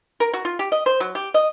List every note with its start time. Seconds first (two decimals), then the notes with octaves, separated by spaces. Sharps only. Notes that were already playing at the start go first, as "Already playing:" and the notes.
0.20 A#4
0.34 F#4
0.45 F4
0.59 G4
0.72 D#5
0.86 C5
1.00 F#3
1.15 G4
1.34 D#5